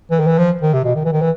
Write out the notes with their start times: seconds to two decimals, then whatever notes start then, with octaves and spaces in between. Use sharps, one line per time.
0.11 E3
0.20 D#3
0.27 E3
0.38 F3
0.62 D#3
0.73 C3
0.84 B2
0.95 D#3
1.05 E3
1.12 D#3
1.21 E3